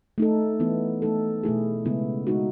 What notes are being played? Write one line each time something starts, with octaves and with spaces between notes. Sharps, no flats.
A3 D#4 A4
E3 B3 E4
A3 D#4 A4
B2 A3 E4 G#4
C#3 G#3 B3 E4
G#3 D#4 F#4